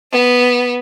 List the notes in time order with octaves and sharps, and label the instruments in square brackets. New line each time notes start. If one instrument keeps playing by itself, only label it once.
[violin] B3